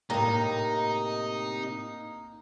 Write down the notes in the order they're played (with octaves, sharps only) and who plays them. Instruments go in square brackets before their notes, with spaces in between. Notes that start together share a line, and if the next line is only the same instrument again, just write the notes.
[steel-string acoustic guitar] A2 C3 [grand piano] A#3 [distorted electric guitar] D#4 [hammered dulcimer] A#5